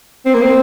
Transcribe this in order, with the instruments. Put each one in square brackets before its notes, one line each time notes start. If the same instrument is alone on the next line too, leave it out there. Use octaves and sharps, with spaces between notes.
[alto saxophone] C4
A#3
C4